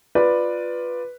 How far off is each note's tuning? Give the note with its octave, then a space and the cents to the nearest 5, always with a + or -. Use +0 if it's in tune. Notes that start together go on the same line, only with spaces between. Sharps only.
F4 +10 B4 +0 D5 +10